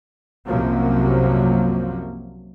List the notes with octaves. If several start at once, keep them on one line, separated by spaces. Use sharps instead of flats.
C2 F#2 C3 F3 F#3 A#3